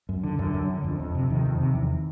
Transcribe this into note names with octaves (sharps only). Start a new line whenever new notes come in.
F#2
D3
F#2 D3
F#2
D3
F2
F2
C3
F2 D#3
F2
C3
E2